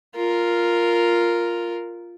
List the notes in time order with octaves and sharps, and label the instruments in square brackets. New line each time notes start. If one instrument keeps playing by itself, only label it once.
[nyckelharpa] F4 A#4